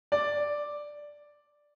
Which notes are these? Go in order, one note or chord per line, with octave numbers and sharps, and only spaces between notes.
D5